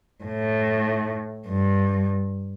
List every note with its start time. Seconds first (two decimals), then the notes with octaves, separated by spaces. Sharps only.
0.24 A2
1.48 G2